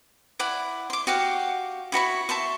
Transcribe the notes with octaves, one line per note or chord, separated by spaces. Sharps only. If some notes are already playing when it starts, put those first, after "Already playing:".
E4 D5 F#5
C6 D6
F#4 G4 F5 F#5
E4 F#4 B5 C#6
E5 A5 C6 C#6